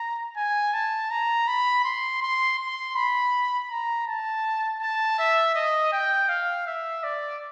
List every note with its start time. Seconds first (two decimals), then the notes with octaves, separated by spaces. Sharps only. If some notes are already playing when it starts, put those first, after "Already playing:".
Already playing: A#5
0.37 G#5
0.74 A5
1.11 A#5
1.48 B5
1.84 C6
2.22 C6
2.59 C6
2.96 B5
3.70 A#5
4.07 A5
4.81 A5
5.18 E5
5.55 D#5
5.93 G5
6.29 F5
6.67 E5
7.04 D5